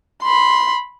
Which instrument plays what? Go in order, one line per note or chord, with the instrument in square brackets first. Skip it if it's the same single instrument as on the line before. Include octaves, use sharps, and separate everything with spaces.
[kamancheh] B5 C6